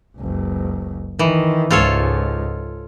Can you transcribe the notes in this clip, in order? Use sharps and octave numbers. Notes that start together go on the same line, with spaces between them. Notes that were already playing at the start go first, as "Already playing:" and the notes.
F#1 C#2
D#3 E3
C#2 G#2 F4 A4 C#5